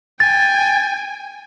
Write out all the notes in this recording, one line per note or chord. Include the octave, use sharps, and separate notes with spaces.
G5 G#5 A6